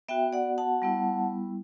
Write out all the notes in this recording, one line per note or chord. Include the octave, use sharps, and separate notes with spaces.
B3 F#4 E5 G5
D5 F#5
F#5 A5
G3 B3 E4